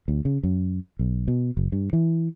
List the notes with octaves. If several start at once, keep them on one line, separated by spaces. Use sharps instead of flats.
D2
C#3
F#2
B1
B2
F#1
G2
E3